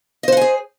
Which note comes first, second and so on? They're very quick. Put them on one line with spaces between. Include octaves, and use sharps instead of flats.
D#5 C5 F#5 G#5 G#4